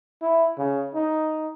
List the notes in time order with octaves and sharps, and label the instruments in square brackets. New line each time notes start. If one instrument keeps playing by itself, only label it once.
[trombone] E4
C#3
D#4